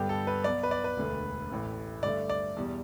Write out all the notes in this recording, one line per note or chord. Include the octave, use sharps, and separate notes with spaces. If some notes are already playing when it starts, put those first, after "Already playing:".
Already playing: G2 D3 G3 B3 G4
A4
B4
B1 B2 B3 D5
B4
D5
B4
E1 D2 D3
A1 A2 E3 A3
G2 D3 A3 D5
D5
E2 B2 G3